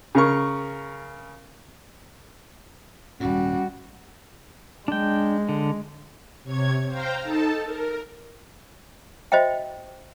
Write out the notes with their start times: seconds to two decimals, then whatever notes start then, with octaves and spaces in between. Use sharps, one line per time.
0.15 C#3 A#4 C#6
3.20 D#1 G#2 G3 C#4 F#4
4.88 G#3 D4 G5
5.49 D3
6.43 C3 C#5 G#6
6.87 C5 F5 G5 A#5
7.23 D#4 A4 A5
7.64 A#4
9.32 F#4 C5 D#5 E5 G5